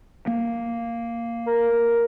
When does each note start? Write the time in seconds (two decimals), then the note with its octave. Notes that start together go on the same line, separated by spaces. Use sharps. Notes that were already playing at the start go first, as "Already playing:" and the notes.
0.27 A#3
1.47 A#4